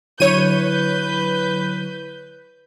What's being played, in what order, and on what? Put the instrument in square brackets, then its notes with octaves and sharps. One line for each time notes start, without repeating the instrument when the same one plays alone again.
[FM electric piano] D3 F#3 E4 [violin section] B4 G6 [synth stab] C#5 D#7